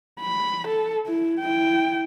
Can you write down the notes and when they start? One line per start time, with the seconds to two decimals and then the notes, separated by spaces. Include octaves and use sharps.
0.21 B5
0.68 A4
1.07 E4
1.41 E4 G5